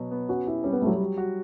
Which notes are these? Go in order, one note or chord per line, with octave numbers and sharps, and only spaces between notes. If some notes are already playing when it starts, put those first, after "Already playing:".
Already playing: B2 F#3 B3
B3
C#4 F#4
E4 G4
G3 C#4
B3
A3 E4
F#3
G3
F#3
F#4